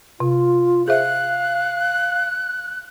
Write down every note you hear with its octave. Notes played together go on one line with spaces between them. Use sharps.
C3 F4
G#4 C5 E5 F5 F#6